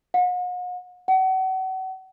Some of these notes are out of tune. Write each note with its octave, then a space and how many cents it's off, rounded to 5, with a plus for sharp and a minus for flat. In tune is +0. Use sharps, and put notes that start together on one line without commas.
F#5 -45
F#5 +35